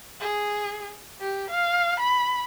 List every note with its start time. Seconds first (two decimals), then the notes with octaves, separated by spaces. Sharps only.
0.21 G#4
1.21 G4
1.50 F5
2.00 B5